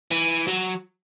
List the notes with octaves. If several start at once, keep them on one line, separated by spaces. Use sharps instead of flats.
E3
F#3